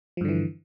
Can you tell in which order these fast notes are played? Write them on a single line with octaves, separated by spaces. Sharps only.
F3 G2 D3 E3